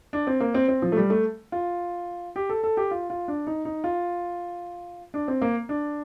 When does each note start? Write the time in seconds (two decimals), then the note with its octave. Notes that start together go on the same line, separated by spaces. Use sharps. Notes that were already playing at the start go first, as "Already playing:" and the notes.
0.13 D4
0.27 C4
0.40 A#3
0.54 C4
0.68 C4
0.82 F3
0.92 A3
0.97 G3
1.10 A3
1.52 F4
2.36 G4
2.49 A4
2.64 A4
2.77 G4
2.91 F4
3.10 F4
3.28 D4
3.47 D#4
3.65 D#4
3.84 F4
5.14 D4
5.28 C4
5.42 A#3
5.69 D4